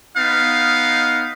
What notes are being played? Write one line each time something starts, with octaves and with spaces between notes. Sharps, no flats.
B3 D#4 F5